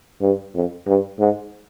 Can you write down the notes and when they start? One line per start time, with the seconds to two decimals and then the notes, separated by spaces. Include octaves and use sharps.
0.21 G2
0.55 F2
0.87 G2
1.19 G#2